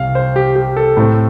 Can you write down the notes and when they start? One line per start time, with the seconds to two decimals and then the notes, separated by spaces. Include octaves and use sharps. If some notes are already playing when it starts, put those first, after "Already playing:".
Already playing: C2 C3 C4 F5
0.15 C5
0.36 G4
0.56 G4
0.77 A4
0.97 A2 A3 C4